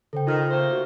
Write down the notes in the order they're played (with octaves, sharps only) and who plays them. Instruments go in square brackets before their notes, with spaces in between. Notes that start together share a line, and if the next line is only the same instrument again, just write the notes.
[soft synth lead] C#3 [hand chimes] A4 C5 G5
[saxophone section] D#3 [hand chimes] F4 F6 A#6
[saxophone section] A3 A#3 C5
[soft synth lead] F#4